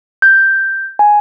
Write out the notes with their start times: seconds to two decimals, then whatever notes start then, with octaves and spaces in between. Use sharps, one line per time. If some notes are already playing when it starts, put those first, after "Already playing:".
0.22 G6
0.99 G#5